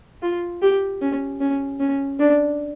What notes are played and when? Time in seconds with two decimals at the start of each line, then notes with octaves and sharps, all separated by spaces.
0.22 F4
0.62 G4
1.02 C#4
1.41 C#4
1.80 C#4
2.20 D4